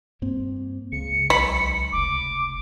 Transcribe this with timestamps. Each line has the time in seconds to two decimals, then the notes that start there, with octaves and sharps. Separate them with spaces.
0.22 G2 A#3 C4
0.92 C#2 C#3 C#7
1.30 B1 B5
1.92 F1 D6